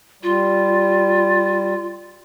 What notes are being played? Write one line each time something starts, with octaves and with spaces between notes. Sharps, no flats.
G3 F4